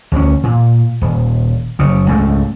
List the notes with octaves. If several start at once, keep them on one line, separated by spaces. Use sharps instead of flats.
D2 C#4
A#2
D#1
F#1 C#3
C#2 G#2 A3